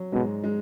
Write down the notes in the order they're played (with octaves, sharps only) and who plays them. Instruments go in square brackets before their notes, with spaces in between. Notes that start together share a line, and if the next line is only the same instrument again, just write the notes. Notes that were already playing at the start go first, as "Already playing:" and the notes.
Already playing: [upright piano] F#3
[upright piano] G#2 G#3 [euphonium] B2
[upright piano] G#3